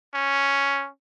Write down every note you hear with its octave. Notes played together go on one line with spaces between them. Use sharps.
C#4